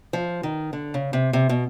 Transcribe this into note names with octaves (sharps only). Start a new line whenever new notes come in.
F3
D#3
D3
C#3
C3
C3
B2